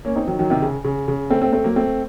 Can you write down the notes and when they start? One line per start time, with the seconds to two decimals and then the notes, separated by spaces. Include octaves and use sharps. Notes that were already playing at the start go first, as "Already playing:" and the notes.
0.05 A#3 C#4
0.16 C4 D#4
0.27 D#3 F#3
0.39 D#3 F#3
0.50 C3 D#3
0.62 C#3
0.84 C#3
1.08 C#3
1.30 A3 C4
1.42 A3 C4
1.53 A3 C4
1.64 F#3 A#3
1.76 A3 C4